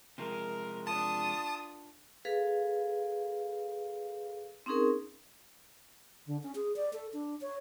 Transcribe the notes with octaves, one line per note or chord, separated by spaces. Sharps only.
C3 F3 G#3 A#4
D4 F4 A5 D#6
G#4 A4 B4 F5
C4 C#4 D#4 G#4 A#4
D3
C#4
G#4
D5
A4
D4
C#5